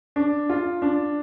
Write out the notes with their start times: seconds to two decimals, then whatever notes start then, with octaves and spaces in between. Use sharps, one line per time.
0.16 D4
0.49 F4
0.82 D4